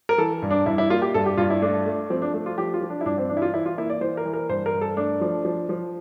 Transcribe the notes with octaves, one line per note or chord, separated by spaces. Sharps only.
A#4
E3 A4
G2
D4
G2 E4
E4
A#3 F4
G4
G2 A4
G4
G2 F4
E4
A3 D4
A3
F3 C4
D4
A3
F4
F3 G4
F4
F3
D4
E4
G2 D4
C4
E3 D4
E4
F4
E3 E4
F4
A#3 E4
D5
E3 C5
A#4
E3
A#4
G2 C5
A#4
G2
A4
A3 D4
F3
F3
F3